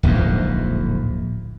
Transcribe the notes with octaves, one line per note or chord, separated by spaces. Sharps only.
D1 A#1 F2 G#2